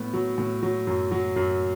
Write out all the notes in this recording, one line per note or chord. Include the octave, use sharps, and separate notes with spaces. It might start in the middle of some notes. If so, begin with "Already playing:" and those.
Already playing: A2 B3
F#3
A2
F#3
F#2
F#3
F#2